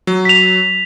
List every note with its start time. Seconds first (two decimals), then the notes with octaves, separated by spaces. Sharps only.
0.07 F#3
0.25 B6 F7